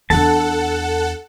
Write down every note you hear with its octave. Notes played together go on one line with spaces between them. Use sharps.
E2 D4 A4 F#5 A5